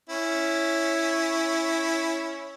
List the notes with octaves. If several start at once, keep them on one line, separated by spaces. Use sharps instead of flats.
C#4 E4